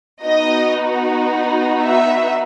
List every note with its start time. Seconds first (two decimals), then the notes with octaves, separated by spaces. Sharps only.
0.22 B3 D#4 F#4 D#5
1.82 E5